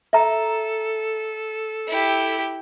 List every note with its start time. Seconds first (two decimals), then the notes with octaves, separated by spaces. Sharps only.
0.13 A4 E5 A#5
1.88 E4 G4